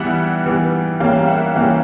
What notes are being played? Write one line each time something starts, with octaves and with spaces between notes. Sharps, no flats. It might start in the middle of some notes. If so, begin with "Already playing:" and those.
Already playing: E3 G3 B3 E5 F#5
E3 G3 B3
E3 G3 A#3 C#4 F5 G5
E5 F#5
E3 G3 A#3 C#4 F5 G5